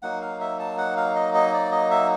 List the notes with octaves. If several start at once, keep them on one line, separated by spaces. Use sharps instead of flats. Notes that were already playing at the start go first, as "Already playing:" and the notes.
F#3 A#3 D#4 F#5
F5
E5
A5
F#5
F5
D#5
D#5
D5
D#5
E5